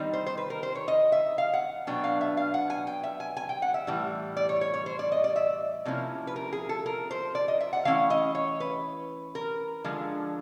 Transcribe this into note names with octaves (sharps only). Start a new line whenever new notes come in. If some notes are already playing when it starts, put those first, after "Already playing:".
Already playing: D#3 G3 C4 D#4
C5
C5
B4
A#4
C5
C#5
D#5
E5
F5
F#5
B2 F#3 B3 D4 G5
F5
E5
F5
F#5
G#5
G5
E5
G#5
G#5
G5
F#5
E5
A2 E3 G3
D5
C#5
C#5
C#5
C5
D5
D#5
D5
E5
C3 F3 A#3 C#4 E4
B4
A#4
G#4
A4
A#4
C5
D5
D#5
E5
F#5
E3 A3 C#4 E4 F5
D#5
C#5
B4
A#4
D3 F3 G#3